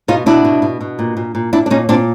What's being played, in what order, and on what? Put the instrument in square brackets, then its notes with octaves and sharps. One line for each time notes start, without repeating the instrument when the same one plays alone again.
[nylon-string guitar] B2 D#4 F4
B2 D4 E4
B2
B2
B2
A#2
A#2
A#2
A#2 D4 E4
D4
A#2 C#4 D#4
A#2 C4 D4